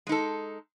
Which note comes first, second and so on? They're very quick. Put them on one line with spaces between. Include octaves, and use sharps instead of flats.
G#3 D#4 A4